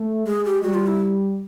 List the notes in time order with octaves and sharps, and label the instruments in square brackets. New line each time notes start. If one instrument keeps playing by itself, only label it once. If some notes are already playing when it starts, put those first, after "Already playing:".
Already playing: [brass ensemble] A3
[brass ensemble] G#3 [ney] G#4
[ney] G4
[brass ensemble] G3 [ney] F#4
[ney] F4
E4